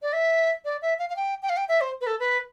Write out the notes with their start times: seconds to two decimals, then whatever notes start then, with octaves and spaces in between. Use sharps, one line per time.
0.02 D5
0.13 E5
0.65 D5
0.82 E5
0.99 F5
1.10 F5
1.16 G5
1.42 G5
1.50 F5
1.57 G5
1.69 E5
1.81 C5
2.01 B4
2.07 A4
2.20 B4